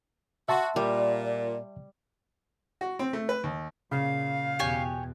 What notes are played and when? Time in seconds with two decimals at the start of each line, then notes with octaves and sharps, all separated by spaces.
0.49 F#4 E5 A5 C6
0.76 A#2 G3 D5
2.81 F#4
2.99 C4
3.13 A3
3.29 B4
3.43 D#2
3.91 A#2 C#3 F5
4.59 E2 B2 G4 C#5 G#5